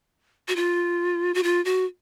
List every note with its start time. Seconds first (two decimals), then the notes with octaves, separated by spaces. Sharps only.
0.48 F#4
0.56 F4
1.34 F#4
1.43 F4
1.65 F#4